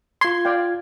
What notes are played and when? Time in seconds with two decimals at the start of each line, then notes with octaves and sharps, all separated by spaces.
0.21 F4 C6 G#6
0.45 D5 F5 G5